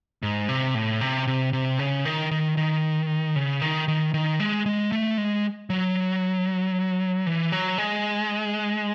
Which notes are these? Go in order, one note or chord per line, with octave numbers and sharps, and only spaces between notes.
G#2
C3
A2
C3
C3
C3
C#3
D#3
D#3
D#3
C#3
D#3
D#3
D#3
G#3
G#3
A3
G#3
F#3
E3
F#3
G#3